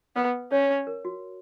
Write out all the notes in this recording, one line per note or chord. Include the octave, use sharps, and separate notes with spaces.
B3 B4
C#4 C#5
A#4
F#4